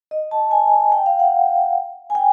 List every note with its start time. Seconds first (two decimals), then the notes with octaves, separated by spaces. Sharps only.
0.11 D#5
0.31 A5
0.51 G#5
0.92 G5
1.06 F5
1.19 F#5
2.10 G#5
2.15 G5